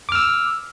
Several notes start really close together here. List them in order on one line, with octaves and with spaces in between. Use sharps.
D6 F6 E6